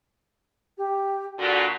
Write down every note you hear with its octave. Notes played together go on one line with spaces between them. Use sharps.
G4
A#2 D3 F#4